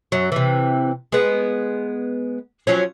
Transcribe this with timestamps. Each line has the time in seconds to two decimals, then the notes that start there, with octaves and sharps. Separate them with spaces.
0.12 F#2 F#3
0.32 C3 E3
1.12 G#3 B3
2.67 F3 F#3 C#4